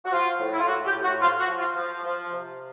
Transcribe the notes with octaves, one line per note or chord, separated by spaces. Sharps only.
F#4
F3 F4
A2
E4
F4
A2 F#4
G4
A2
F#4
F3 F4
F#4
F3
F4
F3
F3
C3